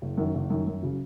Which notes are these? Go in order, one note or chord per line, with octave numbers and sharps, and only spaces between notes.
F#1
F#2 D#3
F#1
F#2 D#3
F#2
C#3 F#3